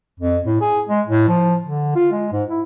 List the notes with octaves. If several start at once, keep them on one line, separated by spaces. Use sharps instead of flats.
F2
A2
G#4
G#3
A2
F3
D3
F4
G#3
G#2
E4